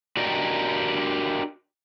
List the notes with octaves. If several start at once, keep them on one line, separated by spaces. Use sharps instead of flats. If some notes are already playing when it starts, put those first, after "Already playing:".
D4 F#4 G4 A#4 D5 D#5